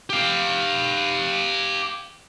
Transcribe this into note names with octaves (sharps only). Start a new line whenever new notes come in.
G4 F5